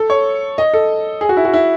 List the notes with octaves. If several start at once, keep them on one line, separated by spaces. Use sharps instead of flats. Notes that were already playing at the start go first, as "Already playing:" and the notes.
Already playing: A4
C#5
D#5
A4
G#4
F#4
E4
F#4
E4